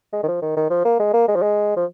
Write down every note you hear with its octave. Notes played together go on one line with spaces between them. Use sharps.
G#3
D#3
F3
D#3
D#3
F3
A#3
G#3
A#3
G#3
F3
G#3
F3